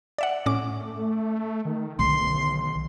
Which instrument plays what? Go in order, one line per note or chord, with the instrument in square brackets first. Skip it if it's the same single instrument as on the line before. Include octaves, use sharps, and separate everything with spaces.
[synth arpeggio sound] D5 E5 F#5
A2 C#4 D6
[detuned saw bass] A3
D#3
[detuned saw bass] B1 [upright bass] D3 D#3 [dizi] C6